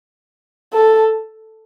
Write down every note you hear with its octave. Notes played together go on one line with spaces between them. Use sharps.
A4